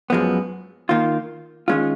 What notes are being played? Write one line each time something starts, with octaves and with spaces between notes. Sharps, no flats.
F#2 F3 G#3 B3
D#3 A#3 F4
D#3 G#3 C#4 F4